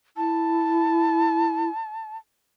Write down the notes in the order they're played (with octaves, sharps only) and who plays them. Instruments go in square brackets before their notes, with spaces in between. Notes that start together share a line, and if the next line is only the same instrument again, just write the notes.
[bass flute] E4 [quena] A5